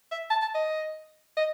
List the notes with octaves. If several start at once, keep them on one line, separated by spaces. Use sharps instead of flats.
E5
A5
A5
D#5
D#5